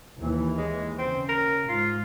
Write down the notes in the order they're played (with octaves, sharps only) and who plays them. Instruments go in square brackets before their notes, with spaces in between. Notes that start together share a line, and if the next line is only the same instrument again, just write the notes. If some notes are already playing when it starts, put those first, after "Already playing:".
[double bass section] D#2 E3
[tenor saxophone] G#3
[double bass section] C#3 [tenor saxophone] C4
[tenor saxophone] A#4
[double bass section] G#2 [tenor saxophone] F4